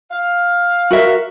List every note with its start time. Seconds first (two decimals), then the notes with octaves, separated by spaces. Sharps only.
0.11 F5
0.91 F#4 A#4 E5